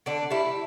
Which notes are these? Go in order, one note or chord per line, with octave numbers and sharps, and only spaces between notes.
D3 D4
G3 E4